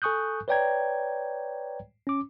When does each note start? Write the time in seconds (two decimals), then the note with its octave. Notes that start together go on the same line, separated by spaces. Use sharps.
0.02 A4 G#5 C#6 D#6 F#6 G6
0.48 B4 C#5 D5 G5 A#5 G#6
2.07 C#4 D6